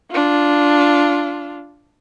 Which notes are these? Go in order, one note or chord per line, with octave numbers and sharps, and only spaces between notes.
D4 F4